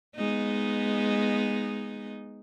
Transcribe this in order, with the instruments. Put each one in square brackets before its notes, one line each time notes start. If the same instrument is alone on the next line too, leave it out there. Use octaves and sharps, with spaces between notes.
[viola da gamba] G#3 B3 D#4